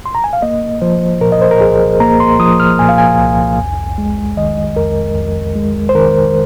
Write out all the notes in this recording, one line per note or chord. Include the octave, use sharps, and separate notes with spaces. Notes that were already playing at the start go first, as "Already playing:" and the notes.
C6
A#5
G#5
F5
A#3 D#5
F3 C5
A#2 A#4
D#5
C5
A#4
C2 G#4
A#3 A#5
C6
F3 D#6
F6
A#2 G#5
F5
G#5
C2
F2
G#3
D#3 D#5
F2 A#4
F2
G#3
C5
D#3 A#4